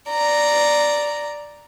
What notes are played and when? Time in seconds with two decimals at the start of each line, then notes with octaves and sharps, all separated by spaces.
0.10 D5 A#5